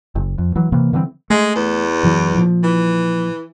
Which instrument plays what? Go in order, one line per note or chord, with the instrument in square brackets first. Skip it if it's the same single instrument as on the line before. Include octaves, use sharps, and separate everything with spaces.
[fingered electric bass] F#1
F2
E3 F#3
C3 E3 A#3
D3 E3 G3 C4
[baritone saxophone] G#3 [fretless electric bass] A3
[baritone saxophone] E2
[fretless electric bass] F#2 E3 F#3
A#2 F3
[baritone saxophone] E3